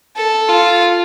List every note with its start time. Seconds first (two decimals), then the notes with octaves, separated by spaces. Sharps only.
0.16 A4
0.49 F4